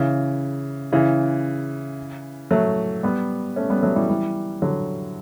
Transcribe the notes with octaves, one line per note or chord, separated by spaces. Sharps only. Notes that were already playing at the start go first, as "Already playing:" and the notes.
Already playing: C#3 E3
C#3 E3
F#3 A3
G3 B3
A3 C#4
G3 B3
F#3 A3
E3 G3
E3 G3
D3 F#3